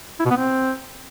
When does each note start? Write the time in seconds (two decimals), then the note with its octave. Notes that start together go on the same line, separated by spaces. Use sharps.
0.20 E4
0.25 B2
0.31 B3
0.36 C4